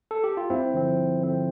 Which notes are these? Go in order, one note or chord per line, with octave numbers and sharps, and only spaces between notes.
A4
G4
F4
G2 C4 E4
D3 F3 C4
G2
D3 F3 C4